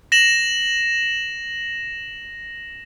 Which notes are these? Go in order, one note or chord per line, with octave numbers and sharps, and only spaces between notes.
A#6 E7 F#7